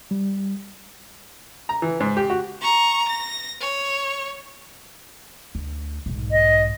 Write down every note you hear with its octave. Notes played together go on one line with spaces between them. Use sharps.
G3
A#5
E3
G#2
G4
F#4
A#5 C#6
A#6
C#5
D2
B1 G#2
D#5